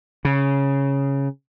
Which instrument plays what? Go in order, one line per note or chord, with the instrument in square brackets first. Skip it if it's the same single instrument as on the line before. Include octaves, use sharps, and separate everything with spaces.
[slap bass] C#3